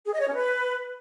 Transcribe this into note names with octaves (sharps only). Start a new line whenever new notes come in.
G#4
D#5
C#5
C#4
B4